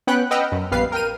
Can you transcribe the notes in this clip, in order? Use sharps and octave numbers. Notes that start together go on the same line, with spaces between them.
B3 C#4 B4 F#5 G5 F#6
B4 D#5 F#5 G5 E6 F6
F#2
A#1 G3 B3 B4 F5 C7
A#4 G5 F6 D#7